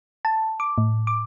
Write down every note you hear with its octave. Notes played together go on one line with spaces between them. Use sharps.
A5
D6
A2
D6